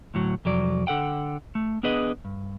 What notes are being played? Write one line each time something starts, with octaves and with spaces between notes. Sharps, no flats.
D2 A2 F#3
C2 F2 F#3 D5
D3 A4 F#5 G5
A3
B3 D4 G#4 B4 D#5
G2